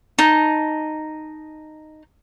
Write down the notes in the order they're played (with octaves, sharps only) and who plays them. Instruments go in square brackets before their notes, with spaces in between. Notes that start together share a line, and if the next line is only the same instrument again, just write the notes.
[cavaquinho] D#4 A5